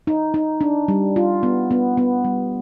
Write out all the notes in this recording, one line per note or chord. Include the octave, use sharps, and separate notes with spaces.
D#4
D#4
D4
G3
F4
B3
B3
B3
G3